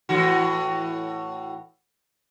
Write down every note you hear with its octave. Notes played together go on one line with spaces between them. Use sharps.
A2 E3 F#4